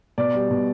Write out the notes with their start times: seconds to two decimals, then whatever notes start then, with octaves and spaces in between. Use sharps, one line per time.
0.18 B2 D5
0.34 G3
0.51 B2